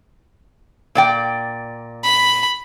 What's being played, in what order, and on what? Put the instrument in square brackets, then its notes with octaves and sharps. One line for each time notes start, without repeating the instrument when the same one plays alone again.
[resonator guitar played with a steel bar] A#2 D5 G5
[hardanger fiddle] B5